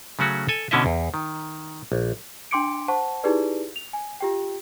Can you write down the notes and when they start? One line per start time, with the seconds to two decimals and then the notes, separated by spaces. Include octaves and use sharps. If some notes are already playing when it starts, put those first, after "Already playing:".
0.19 C#3 F#3 A3 C#4 F#4
0.49 A4 G#5
0.71 B2 D3 C#4 E4 D#5 E5
0.86 E2
1.14 D#3
1.92 A#1
2.51 D4 G5 C6 D6 C#7 D7
2.88 C5 F#5 A5 C#6
3.23 D#4 E4 G4 G#4 B4 D5
3.76 F7
3.93 G#5
4.20 F4 G4 G5